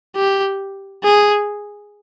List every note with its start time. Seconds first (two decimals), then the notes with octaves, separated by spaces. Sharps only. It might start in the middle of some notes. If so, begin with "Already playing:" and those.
0.16 G4
1.04 G#4